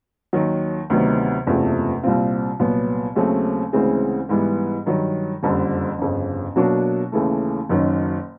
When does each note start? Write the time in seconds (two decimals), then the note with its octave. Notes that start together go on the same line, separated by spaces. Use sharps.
0.33 D#2 D#3 F#3
0.90 D2 C3 D#3 F#3 B3
1.46 F#1 E2 C3 F3 A3
2.03 C2 A#2 G3 C4 F4
2.60 C2 A#2 F#3 B3
3.15 D#2 C#3 F#3 A3 C4
3.73 D2 C#3 E3 G#3 C4
4.29 G#2 E3 G3 B3
4.86 G2 D#3 F#3
5.43 F#1 F2 D3 G3
5.99 G1 F2 C#3
6.56 B2 F#3 A#3 D4 F#4
7.12 D#2 C#3 E3 A3
7.69 F#1 F#2 D#3 F#3